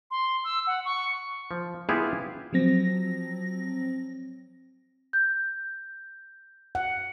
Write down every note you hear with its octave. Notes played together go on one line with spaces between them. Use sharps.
C6
E6
F#5
C#6
F3
B3 E4 F4 G4 G#4
F3 F#3 C4 A#6
G6
F#5